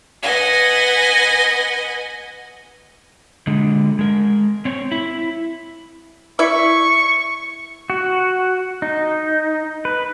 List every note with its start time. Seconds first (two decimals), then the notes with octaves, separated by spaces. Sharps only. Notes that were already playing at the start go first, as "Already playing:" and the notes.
0.23 B4 D#5 F#5 G#5
3.47 D3 G#3
3.99 G#3 A#4
4.65 C4 C#5
4.92 E4
6.39 E4 D5 E5 C#6
7.90 F#4
8.82 D#4
9.85 B4